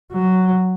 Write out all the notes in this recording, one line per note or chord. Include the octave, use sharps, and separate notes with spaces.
F#3